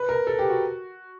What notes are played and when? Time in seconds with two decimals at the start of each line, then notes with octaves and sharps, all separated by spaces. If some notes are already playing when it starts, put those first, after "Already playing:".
Already playing: B4
0.09 A#4
0.27 A4
0.39 G4
0.49 F#4